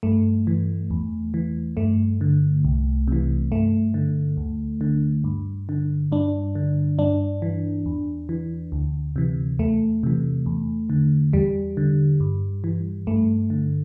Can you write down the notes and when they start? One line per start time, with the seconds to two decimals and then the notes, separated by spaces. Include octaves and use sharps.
0.03 G2 A3
0.47 E3
0.91 E2
1.34 E3
1.77 G2 A3
2.21 D3
2.65 C2
3.08 C3 E3
3.52 G2 A3
3.94 D3
4.37 D2
4.81 D3
5.24 G2
5.69 D3
6.12 G2 D4
6.55 D3
6.99 G2 D4
7.42 E3
7.86 E2
8.29 E3
8.72 D2
9.16 C3 E3
9.59 E2 A3
10.03 C3 E3
10.46 E2
10.90 D3
11.33 E2 G3
11.77 D3
12.20 G2
12.64 E3
13.07 G2 A3
13.50 D3